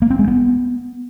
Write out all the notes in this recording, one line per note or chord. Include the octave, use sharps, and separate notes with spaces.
A#3
C4
G#3
B3